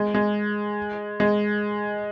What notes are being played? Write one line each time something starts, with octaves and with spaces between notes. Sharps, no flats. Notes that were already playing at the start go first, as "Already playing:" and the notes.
Already playing: G#3
G#3
G#3